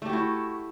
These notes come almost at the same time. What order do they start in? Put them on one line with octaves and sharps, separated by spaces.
A3 G4 F#4 E4